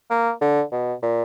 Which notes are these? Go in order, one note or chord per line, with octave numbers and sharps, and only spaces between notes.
A#3
D3
B2
A#2